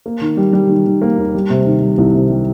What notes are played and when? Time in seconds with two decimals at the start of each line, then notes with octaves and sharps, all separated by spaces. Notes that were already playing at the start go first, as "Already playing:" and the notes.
0.06 A#3
0.22 D#3
0.37 G3
0.53 G3
0.69 D#3
0.86 D#3
1.02 A#3
1.18 D#2
1.35 G3
1.50 C3
1.66 D#3
1.82 G3
1.98 C2
2.14 C3
2.30 G3